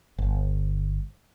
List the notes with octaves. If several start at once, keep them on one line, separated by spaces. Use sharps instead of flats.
G1